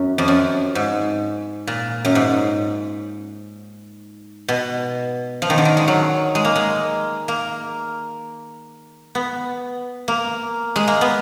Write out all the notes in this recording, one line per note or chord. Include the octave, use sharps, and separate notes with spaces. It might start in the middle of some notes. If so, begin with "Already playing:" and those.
Already playing: F#2
F2
F#2
G#2
A#2
F#2
G#2
B2
F3
D#3
D3
D#3
G#3
F#3
G#3
A#3
G#3
A#3
B3
A#3
G#3
A#3
B3